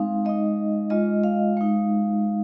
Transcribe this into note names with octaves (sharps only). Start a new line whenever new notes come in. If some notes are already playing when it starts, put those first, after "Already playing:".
Already playing: G#3 C4 D#4 F5
G#3 D#4 D#5
G#3 F4 D#5
F5
G#3 D#4